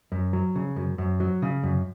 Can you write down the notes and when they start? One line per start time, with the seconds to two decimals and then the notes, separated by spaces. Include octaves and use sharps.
0.12 F#2
0.33 F#3
0.56 C#3
0.76 F#2
0.98 F#2
1.20 F#3
1.42 C#3
1.63 F#2